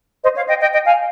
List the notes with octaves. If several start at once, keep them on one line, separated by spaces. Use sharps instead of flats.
C5 D#5
C#5 F5
D#5 G5
D#5 G5
D#5 G5
F5 G#5